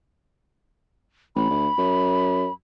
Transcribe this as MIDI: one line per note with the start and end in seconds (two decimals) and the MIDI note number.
1.36 1.49 33
1.36 2.53 83
1.51 1.68 38
1.78 2.47 42